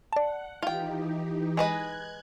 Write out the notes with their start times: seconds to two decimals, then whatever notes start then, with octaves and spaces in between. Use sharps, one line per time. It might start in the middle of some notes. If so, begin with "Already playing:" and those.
0.13 D5 F#5 A5
0.63 E3 D#4 F4 G4 G5
1.57 G#3 B4 D#5 F#6 G#6